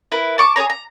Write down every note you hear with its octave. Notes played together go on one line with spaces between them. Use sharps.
E4 A#4 B4
A5 C#6 D6
G#4 B4 C#5 A#5
A#5